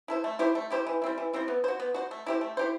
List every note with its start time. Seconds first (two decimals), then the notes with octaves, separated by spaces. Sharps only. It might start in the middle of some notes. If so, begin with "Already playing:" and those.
0.08 E4 A4 C5
0.24 A3
0.39 E4 G4 C5
0.55 A3
0.70 E4 G4 C5
0.86 E3
1.02 G3 C4 E4
1.18 E3
1.33 G3 C4 E4
1.48 B3
1.64 F#4 C5
1.80 B3
1.94 F#4 C5
2.11 A3
2.26 E4 G4 C5
2.41 A3
2.57 E4 G4 C5